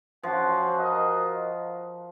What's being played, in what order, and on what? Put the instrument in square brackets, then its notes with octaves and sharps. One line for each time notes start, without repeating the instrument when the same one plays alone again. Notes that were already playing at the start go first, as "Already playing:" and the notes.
[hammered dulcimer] F3 [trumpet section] C#4 F#4 C5 F#5
[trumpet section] F#4 A#4 D#5